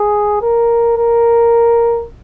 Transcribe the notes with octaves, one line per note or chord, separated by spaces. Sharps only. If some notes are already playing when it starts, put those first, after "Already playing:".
Already playing: G#4
A#4
A#4